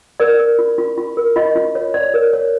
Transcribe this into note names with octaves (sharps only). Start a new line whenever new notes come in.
A#4 D5
A#4
F4
F4
F4
A#4
F4 D#5
F4
C#5
C#5 D5
A#4
C#5